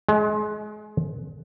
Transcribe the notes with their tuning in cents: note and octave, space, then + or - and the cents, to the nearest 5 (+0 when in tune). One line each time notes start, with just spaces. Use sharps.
G#3 +30